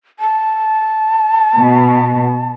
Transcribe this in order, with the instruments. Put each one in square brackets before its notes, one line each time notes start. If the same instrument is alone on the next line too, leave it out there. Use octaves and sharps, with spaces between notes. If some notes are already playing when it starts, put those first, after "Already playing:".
[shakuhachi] A5
[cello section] B2